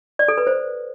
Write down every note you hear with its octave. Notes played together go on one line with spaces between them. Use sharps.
D5
A4
B4
C5